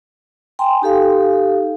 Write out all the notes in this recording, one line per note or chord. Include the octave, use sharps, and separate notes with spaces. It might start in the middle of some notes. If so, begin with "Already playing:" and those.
G5 G#5 A#5 C6
D#4 G4 A4 F5